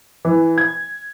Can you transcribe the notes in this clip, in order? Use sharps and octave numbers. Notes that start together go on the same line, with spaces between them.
E3
G#6